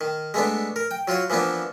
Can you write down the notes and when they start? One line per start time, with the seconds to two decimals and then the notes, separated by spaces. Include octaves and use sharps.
0.01 D#3
0.34 G#3 A3 B3 D4
0.76 A#4
0.91 G5
1.08 F#3 F4 F#4 C#5
1.30 E3 F3 A#3 B3 D4